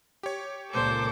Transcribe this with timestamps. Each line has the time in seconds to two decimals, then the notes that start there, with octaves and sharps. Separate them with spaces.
0.23 G4 C#5
0.73 C#2 A#2 A4 C5 D6